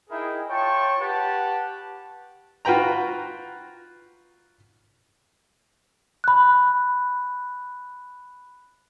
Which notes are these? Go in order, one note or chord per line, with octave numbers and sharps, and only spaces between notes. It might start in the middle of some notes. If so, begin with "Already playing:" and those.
D#4 E4 G#4 A#4 G5
F4 C#5 G5 A5 C#6
G4 B4 F#5 A5
F4 F#4 B4 G5 A#5
B5 F#6